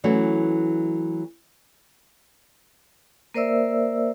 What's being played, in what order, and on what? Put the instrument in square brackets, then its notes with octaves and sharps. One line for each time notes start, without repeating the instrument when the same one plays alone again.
[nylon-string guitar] E3 F#3 A3 C#4 F#4
[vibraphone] A#3 A#4 C5 D5 E5 E6